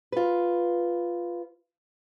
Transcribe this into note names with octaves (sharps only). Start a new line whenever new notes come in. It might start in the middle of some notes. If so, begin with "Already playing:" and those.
F4 B4